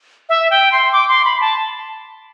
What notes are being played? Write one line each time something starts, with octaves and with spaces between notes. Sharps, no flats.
E5
G5
C6
D6
C6
B5
A5